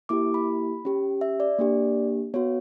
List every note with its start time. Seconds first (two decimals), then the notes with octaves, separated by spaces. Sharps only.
0.09 A#3 E4 G4 D6
0.34 B5
0.85 C#4 G4
1.21 E5
1.40 D5
1.59 A#3 D4 G4
2.34 B3 F#4 C#5